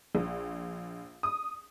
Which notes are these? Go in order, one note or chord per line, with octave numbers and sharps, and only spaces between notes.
A#1
D#6